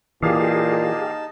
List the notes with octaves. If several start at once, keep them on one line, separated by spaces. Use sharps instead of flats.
A#2 E3 D#4 G4 G#4 F5 A5